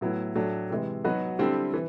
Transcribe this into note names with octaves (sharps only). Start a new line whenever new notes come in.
A2 F#3 B3 E4
A2 F#3 A3 D4
C3 E3 G#3
F#3 B3 D#4 F#4 B4
D3 G3 C4 E4 G4
E3